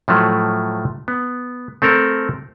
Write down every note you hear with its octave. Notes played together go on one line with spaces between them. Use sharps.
A2 F3 F#3 A3
B3
A3 C4 A4 A#4